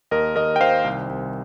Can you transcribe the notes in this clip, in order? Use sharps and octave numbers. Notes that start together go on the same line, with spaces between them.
D#2 A#4 D#5
D#2 A#4 D#5
G5
D#3 C5 F5
C2
C2